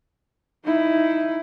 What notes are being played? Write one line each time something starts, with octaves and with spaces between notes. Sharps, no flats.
D#4 E4